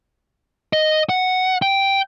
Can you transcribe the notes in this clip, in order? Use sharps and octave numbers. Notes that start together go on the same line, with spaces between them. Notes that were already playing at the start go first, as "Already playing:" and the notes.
D#5
F#5
G5